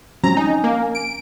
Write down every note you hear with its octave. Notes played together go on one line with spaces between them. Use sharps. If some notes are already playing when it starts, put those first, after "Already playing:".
F3 F#3 G#3 C4 C#4 A#5
D#4 G#5
A#3
D7